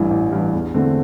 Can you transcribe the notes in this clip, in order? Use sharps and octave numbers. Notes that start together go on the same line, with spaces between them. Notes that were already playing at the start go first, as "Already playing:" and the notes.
Already playing: A1 G2 E3
A1
G2 E3
E2
D3 A3 C4